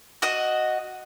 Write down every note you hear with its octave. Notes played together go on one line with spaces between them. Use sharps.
F#4 D#5